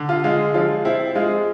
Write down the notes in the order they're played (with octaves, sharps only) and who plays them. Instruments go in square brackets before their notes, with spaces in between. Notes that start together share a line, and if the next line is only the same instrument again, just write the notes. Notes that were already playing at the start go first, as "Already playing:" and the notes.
Already playing: [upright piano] D3
F4
G#3 F4
F3 F4
C4 E4
G#3 F4